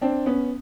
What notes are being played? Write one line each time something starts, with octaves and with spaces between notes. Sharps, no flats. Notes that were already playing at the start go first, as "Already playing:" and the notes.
C4 D4
B3 C#4